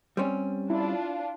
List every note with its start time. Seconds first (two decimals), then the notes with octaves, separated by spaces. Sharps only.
0.17 G3 C4 C#4
0.70 D4 E4 F4